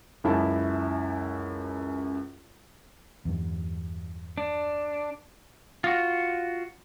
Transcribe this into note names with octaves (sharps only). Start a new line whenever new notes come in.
C#2 F#2 E4 A5
E2 G2
D4
F4 F#4